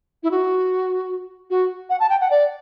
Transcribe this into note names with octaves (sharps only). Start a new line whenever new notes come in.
E4
F#4
F#4
F#5
A5
G5
F#5
D5